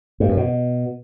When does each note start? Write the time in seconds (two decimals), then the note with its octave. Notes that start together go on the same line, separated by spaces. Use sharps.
0.20 G2
0.29 F#2
0.37 B2